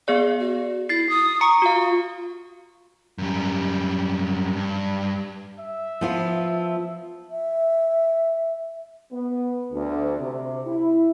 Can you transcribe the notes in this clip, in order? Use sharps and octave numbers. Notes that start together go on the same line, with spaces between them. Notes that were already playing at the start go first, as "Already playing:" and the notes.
B3 G#4 D5 F5
F#4
E4 A6 C7
D#6
A#5 C#6 C#7
F4 F#4 F5
F#2 G3
G2
E5
F3 B3 F4
E5
B3
D2
C3
E4